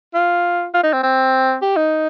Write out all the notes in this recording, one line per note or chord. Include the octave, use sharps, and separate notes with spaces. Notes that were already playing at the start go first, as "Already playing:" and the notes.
F4
F4
D#4
C4
C4
G4
D#4